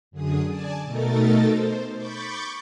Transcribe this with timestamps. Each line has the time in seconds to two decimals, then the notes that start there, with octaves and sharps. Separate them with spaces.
0.11 F#2 D3 G#4 D#6
0.48 D5 G#5 A5
0.83 B2 A3 D#4 A4 A#4 A6
1.47 C5
1.95 B5 C#6 D6 G6 A6